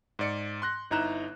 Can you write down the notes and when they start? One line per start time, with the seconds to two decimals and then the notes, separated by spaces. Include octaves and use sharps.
0.19 G#2 D5 C#7
0.62 C6 F#6 A#6
0.91 G1 D#4 E4 A#5 F#6 E7